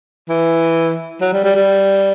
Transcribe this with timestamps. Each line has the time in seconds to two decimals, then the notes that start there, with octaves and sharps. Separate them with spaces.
0.29 E3
1.21 F#3
1.33 G3
1.44 G3
1.56 G3